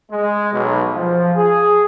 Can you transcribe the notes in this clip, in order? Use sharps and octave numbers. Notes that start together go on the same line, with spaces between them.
G#3
B1
F3
G#4